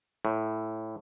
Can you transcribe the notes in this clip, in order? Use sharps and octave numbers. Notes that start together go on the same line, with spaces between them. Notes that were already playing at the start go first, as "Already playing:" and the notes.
A2